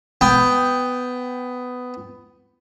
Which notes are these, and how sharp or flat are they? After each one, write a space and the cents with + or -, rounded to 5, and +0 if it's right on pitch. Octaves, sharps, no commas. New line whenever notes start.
B3 +15 G5 +0